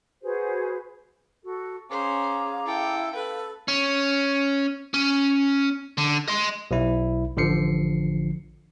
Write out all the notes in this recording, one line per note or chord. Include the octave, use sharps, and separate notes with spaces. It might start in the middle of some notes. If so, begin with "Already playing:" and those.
F#4 G#4 B4 C5
F#4 A4
C#4 G#4 C5 F5 A#5 D6
E4 A4 G5
A4 B4
C#4
C#4
D3
D#5 C6
B1 E4
A1 D3 F3 C7 C#7